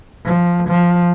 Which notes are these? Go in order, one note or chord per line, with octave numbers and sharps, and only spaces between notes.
F3
F3